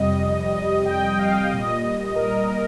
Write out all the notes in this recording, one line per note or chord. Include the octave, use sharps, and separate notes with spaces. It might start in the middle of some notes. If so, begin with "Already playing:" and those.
Already playing: F2 C3 G3 D#5
G5
F5
A#2 G3 D#5
A#4
A#4